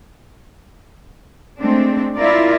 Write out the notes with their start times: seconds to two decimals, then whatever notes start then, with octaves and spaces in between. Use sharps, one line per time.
1.58 G#3 A3 C4 D4
2.16 E4 F4 A#4 D5